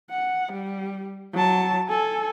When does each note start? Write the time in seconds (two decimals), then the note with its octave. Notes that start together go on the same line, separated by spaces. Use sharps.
0.10 F#5
0.52 G3
1.33 F#3 A5
1.89 A4 G#5